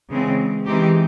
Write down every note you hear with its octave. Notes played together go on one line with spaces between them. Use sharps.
C#3 E3 G#3 C4
E3 G#3 C4 D#4 G4